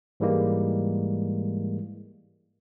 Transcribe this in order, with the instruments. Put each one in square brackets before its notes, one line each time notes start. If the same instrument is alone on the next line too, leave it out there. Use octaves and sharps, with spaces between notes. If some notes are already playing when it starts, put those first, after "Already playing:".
[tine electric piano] G#2 E3 G3 G#3 A#3